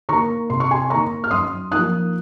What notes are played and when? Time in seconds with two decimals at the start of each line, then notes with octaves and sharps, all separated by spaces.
0.09 D#3 A#3 A#5 C#6
0.50 C3 C6
0.60 C#6
0.71 G#5 C6
0.90 D#3 A#3 A#5 C#6
1.24 F6
1.31 F#2 C6 D#6
1.72 F3 A#3 D#4 D#6 F#6